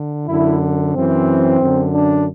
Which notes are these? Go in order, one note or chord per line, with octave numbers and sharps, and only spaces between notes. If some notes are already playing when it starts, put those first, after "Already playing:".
Already playing: D3
F#2 D3 E4
F#2 E3 C4
F#2 D3
D4